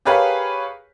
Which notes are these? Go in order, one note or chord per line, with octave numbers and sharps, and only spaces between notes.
G4 G#4 A#4 B4 C#5 F5